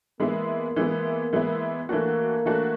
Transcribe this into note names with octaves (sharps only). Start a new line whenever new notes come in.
E3 G#3 A#3 B3 E4
E3 G#3 B3 E4
E3 G#3 B3 E4
E3 A3 A#3 D4 F#4
E3 A3 D4 F#4